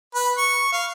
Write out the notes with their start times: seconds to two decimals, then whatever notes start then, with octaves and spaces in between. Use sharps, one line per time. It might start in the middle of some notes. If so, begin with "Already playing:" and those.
0.15 B4
0.38 C#6
0.72 F5